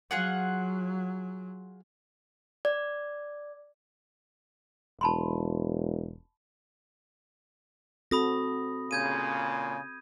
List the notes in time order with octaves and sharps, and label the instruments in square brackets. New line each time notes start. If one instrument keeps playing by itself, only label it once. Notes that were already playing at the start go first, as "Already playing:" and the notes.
[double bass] F#3 [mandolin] F4 G#4 F#5
[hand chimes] D5
[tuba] E1 [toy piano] A5 B5 C6
[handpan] C4 F#4 A4 [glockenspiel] B5 D#6 A#6
[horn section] A#2 C#3 [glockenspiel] G6 G#6 D#7